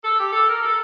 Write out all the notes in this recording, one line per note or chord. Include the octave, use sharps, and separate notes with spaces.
A4
G4
A4
A#4
A4